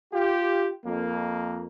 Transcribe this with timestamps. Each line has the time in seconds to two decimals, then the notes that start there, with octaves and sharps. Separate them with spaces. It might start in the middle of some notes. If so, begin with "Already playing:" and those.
0.14 F4 G4
0.85 F2 A#3